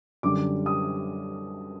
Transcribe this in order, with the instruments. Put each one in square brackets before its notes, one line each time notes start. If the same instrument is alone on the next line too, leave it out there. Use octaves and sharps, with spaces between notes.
[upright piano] F#2 D3 G3 D6
D#6